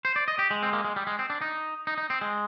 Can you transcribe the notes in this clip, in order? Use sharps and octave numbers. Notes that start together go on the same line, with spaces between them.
C5
D5
D#5
G4
G#3
C4
A#3
G#3
G3
G#3
C4
D4
D#4
D#4
D#4
C4
G#3